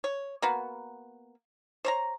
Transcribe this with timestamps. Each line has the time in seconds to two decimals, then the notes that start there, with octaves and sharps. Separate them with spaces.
0.04 C#5
0.42 A#3 B3 F#4
1.85 C5 C#5 A#5